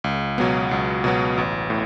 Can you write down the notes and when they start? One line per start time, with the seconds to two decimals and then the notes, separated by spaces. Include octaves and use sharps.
0.04 C#2
0.38 B2 F#3 B3
0.71 C#2
1.04 B2 F#3 B3
1.38 A1
1.70 A2